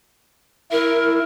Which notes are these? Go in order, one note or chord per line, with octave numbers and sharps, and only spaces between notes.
E4 A#4